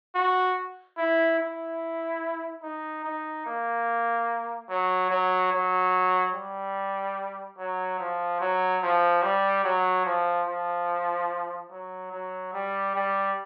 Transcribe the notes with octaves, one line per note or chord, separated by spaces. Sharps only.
F#4
E4
E4
D#4
D#4
A#3
F#3
F#3
F#3
G3
F#3
F3
F#3
F3
G3
F#3
F3
F3
F#3
F#3
G3
G3